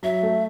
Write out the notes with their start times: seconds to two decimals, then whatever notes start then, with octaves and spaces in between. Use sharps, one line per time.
0.03 F#3 E5
0.23 A3